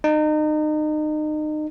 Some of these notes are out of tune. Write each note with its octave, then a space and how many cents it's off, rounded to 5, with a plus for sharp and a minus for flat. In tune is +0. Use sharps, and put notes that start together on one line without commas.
D#4 -30